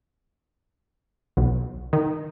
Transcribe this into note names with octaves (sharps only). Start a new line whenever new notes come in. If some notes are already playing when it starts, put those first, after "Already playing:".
B1
D#3